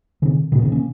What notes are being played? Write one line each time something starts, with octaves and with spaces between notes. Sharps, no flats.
C3 D#3
A#2 C#3
C3 D#3
A#3 C#4